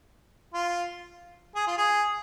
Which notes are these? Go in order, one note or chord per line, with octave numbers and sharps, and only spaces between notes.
F4
G#4
F4
G#4